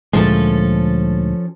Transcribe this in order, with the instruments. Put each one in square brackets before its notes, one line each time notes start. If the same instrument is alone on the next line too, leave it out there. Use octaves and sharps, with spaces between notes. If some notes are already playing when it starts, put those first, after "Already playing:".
[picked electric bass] D2 A#2 G#3 [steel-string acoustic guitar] F3 C#4 A4